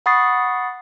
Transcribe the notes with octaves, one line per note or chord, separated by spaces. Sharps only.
F#5 B5 C#6 D#6 A6 C7